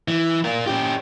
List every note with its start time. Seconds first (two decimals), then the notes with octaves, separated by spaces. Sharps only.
0.08 E3
0.44 F4 A#4
0.66 C#4 G4